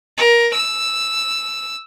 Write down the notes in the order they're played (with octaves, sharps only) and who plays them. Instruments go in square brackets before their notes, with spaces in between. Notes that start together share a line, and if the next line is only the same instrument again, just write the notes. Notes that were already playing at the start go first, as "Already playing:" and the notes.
[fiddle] A#4
E6